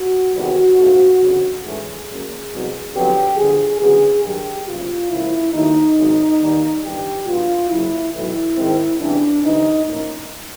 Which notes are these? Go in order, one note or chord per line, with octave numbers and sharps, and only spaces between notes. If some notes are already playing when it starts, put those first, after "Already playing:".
Already playing: F#4
E2 C3 D#3 G3
A#1 G#2 F3 A3
G1 F2 C#3
G#2 E3 A3 C#4 G#4
F#2 C#3 F#3 A#3
C2 B2 F#3
F2 D3 F#3 B3 G4
G1 G2 D3 F3 G#4
D2 C#3 F#3 B3 G#4
G2 D#3 F#3 G4
F#1 E2 C3 E3 G3 F4
C#2 C#3 F3 A#3 E4
D#2 D#3 F#3 A3 D#4
G#1 F#2 C#3
D#2 D#3 G3 A#3
G1 G2 E3 G3 G4
A2 F#3 B3 D4 F4
F#1 F#2 C#3 E4
B1 A2 E3 E4
G#1 G#2 D#3 G#3 C4
F2 C#3 E3 G3 B3 D4
D2 C3 E3 D#4
A2 F3 A#3 C#4 D#4